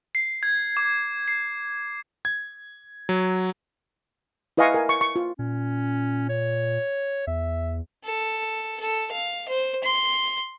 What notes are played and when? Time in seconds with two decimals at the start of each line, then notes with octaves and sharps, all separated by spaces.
0.15 C7
0.43 G#6
0.77 D6
1.28 C7
2.25 G#6
3.09 F#3
4.57 E4 B4 D#5 F5 G#5 C#6
4.74 A#4 G#5
4.89 C#6
5.01 C#6
5.16 F4
5.39 A#2 C#4
6.29 C#5
7.27 E2 E5
8.04 A4
8.80 A4
9.12 F5
9.49 C5
9.84 C6